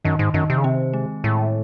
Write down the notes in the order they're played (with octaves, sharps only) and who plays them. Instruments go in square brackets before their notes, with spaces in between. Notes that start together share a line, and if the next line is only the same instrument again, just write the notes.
[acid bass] F#2 [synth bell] D#3
[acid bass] G#2
[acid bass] F#2 [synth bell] D#3
[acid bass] C3
C#3
[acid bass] C3 [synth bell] C4
[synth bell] G#3
[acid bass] A2 [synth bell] G#3